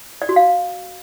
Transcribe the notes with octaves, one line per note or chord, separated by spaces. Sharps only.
D5
F#4
F5